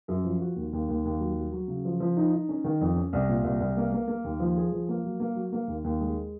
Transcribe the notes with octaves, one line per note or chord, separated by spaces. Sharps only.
F#2
F3
F#4
D#2
D#2
D#2
D#2
F#3
F#3
F#3
C#3
F3
F3
D#4
D#4
C#4
D#3
F2
C#4
C2
A#2
C2
C2
A#3
A#3
A#3
D#2
F3
G#4
F3
A#3
F#3
A#3
F#3
A#3
D#2
D#2
G#3